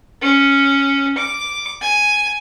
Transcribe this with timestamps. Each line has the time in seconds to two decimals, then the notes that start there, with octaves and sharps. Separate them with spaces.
0.22 C#4
1.18 D6
1.81 G#5